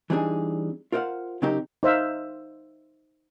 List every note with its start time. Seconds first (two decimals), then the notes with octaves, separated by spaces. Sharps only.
0.10 E3 G3 C4 D4 D#4 G#4
0.92 F4 A#4 C5 D5 F5 F#5
1.42 C#3 F#3 C4 D#4 G4 A#4
1.83 D#4 C5 E5 F5